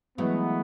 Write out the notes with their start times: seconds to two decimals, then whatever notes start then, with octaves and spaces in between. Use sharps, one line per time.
0.18 E3 F#3 G#3 A3 B3